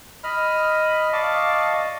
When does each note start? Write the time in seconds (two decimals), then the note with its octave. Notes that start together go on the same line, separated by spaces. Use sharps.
0.24 D#5 B5 F6
1.13 D5 D#5 F5 A5 C#6 D6